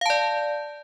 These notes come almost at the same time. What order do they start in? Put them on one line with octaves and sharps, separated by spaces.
F5 A5 D5